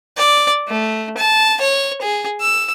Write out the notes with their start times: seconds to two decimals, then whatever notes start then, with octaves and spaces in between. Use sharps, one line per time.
0.17 D5
0.69 A3
1.17 A5
1.60 C#5
2.02 G#4
2.41 E6